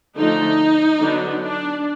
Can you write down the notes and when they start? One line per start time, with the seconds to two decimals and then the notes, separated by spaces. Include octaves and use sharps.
0.16 D3 F3 A3 D#4
1.00 D3 F#3 B3 D4
1.41 D4